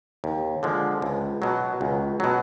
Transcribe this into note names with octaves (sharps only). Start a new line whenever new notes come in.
D#2
D3 F3 G#3
C#2
B2 F#3
C#2
B2 F#3